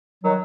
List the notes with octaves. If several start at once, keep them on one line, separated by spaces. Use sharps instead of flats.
D#3 F#3